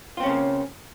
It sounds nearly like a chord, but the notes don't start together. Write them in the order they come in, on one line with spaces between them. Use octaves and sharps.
F4 C4 C#4 C#3 A#3